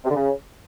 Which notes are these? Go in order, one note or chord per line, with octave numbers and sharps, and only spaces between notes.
C3
D3
C#3